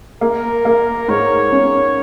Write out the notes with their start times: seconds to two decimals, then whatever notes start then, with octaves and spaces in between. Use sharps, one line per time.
0.21 A#3 A#4
0.65 A#3
1.08 G#2 C#5
1.52 C#4